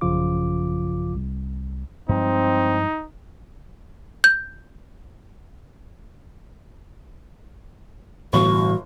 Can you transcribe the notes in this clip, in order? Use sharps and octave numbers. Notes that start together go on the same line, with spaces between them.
A1 F#2 C#3 F3 F4 D6
C2
G2 F3 G#3 C4 D#4
G6
G1 A2 E3 G3 F#4 C#6